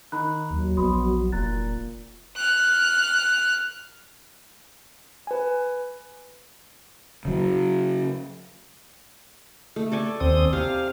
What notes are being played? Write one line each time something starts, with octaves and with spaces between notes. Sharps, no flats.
D#3 A#5 B5 F#6
D#2 F#3
A#1 B2 B5 C6 D#6
F1 A#2 A#5 F#6 A6
F6 F#6
B4 G#5
C#3 F#3
A3
A4 D5 G#5
D#2 C4 D#6
C3 F5